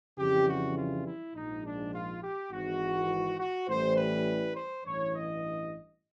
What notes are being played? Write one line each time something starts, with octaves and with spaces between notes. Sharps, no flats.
F2 C#3 E3 G3 G4
F#4
F4
E4
A#1 G#2 F3 D#4
D4
F4
G4
G#1 G#2 E3 F#4
F#4
A1 A2 E3 G3 C5
B4
C5
A1 G2 E3 C#5
D#5